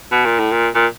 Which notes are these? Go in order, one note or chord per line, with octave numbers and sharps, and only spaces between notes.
B2
A#2
A2
A#2
A#2